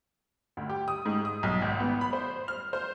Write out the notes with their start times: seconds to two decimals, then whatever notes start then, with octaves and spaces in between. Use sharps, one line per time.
0.57 D2
0.69 G4
0.88 D#6
1.05 G#2
1.25 D#6
1.43 B1
1.62 G#1
1.80 B3
2.01 B5
2.13 C5
2.48 F6
2.73 C5